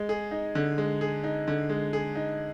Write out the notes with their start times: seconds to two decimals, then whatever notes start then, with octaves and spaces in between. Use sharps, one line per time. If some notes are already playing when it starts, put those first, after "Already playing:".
Already playing: G#3
0.09 G#4
0.31 D#4
0.55 D3
0.78 G#3
1.01 G#4
1.24 D#4
1.48 D3
1.69 G#3
1.93 G#4
2.15 D#4